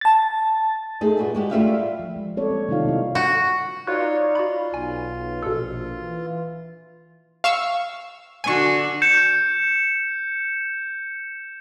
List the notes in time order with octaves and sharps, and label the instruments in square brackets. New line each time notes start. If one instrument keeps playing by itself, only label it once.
[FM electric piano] A5 A6
[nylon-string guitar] A3 D#4 G#4 A4
G2 A#2 F#4
G#3 F#4 G4
G3 A3 E4 F4 E5 F5
[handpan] F3
G#3
G3 A#3 C4 A4 C#5 D5
A#3
C3 D#3 G3 D#4 F4 F5
C3 E4
[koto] F#4
[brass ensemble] D#4 D5 F5 [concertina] F4 C#5 [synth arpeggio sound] F#4 B4
[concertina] F4 [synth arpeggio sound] F#4 B5
[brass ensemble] B1 [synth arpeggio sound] G#5
[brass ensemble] A#1 [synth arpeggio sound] B2 A4
[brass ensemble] E3
[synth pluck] F5 C#6 E6
[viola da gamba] D3 D4 F#4 [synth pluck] G#5 C#6
[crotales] G6 C#7 E7